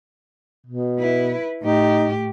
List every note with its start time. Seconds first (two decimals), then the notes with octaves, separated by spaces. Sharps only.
0.66 B2
0.99 E4 B4
1.62 A2 D#4 G4